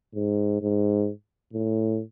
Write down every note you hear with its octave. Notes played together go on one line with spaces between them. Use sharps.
G#2
G#2
A2